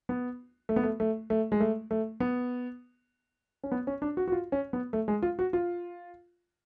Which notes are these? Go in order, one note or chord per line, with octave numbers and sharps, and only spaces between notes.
B3
A3
B3
A3
A3
A3
G#3
A3
A3
B3
C#4
B3
C#4
D4
F#4
F#4
F4
C#4
B3
A3
G#3
F4
F#4
F4